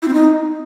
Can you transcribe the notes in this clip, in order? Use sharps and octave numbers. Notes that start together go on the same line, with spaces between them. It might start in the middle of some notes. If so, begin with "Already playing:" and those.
E4
C4
D#4